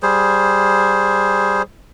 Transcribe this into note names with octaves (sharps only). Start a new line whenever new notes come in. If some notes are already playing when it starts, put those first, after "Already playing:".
G3 G#4 C5